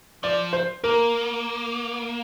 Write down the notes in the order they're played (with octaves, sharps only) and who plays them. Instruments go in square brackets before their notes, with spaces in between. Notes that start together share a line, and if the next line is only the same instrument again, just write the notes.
[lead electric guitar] F3 [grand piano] D5
[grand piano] C5
[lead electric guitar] A#3 [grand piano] A#4